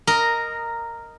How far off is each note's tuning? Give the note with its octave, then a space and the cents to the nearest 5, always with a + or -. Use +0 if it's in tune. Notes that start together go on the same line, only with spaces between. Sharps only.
A#4 -5 D#5 +0